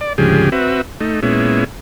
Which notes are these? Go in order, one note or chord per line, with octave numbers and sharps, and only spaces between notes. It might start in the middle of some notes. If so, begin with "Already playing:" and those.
D5
D2 G#2 C#3 F3 G4 G#4
C4 F#4 B4 E5
A3 D#4
A#2 G#3 B3 C#4 E4